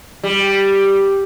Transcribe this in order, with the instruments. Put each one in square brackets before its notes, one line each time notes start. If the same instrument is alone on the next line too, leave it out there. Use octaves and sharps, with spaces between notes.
[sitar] G3